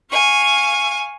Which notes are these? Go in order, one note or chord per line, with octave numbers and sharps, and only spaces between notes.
F5 G#5 C#6